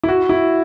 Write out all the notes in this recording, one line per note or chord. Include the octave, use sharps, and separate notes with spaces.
E4
F#4
E4